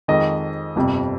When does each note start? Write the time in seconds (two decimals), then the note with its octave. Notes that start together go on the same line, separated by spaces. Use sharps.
0.08 F2 D#3 G#3 D#5
0.76 G1 F2 C3 G3